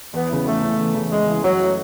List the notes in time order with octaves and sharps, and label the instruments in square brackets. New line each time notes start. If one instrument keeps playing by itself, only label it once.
[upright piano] E2 [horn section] B3
[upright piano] C#3 E3
[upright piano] E2 [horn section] A3
[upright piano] C#3 E3
E2
C#3 E3
[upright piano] E2 [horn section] G#3
[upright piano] C#3 E3
[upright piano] F#2 [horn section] F#3
[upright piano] E3 A3